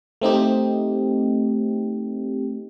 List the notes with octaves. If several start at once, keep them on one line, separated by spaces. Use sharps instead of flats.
A3 C4 D#4 G4